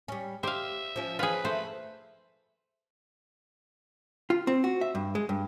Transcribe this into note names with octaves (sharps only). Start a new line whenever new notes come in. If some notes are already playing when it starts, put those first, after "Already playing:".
G3 C#4
G4 C5 E5 F5
F3 C#4
F4 G#4 B4
A3 C5
F4
C4
F#4
E5
G2
G#3
G2